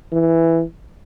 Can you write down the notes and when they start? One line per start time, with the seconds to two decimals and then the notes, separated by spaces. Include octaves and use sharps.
0.12 E3